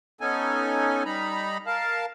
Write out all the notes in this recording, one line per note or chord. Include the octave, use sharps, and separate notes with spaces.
B3 C#4 D#4 A4 G#5
G3 D#4 A#5 B5
A#4 F5 A5